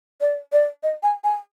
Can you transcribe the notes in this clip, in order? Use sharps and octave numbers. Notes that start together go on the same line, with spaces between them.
D5
D5
D#5
G#5
G#5